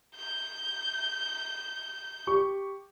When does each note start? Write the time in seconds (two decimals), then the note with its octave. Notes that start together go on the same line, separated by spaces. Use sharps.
0.16 G6
2.27 G4 C#6